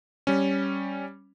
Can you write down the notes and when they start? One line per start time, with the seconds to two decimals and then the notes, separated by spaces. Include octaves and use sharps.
0.27 G3 C#4